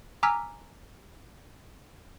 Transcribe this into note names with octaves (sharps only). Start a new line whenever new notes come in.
G#5 A#5 D6 E6 F6 B6